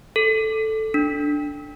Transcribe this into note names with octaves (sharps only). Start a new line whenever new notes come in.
A4
D4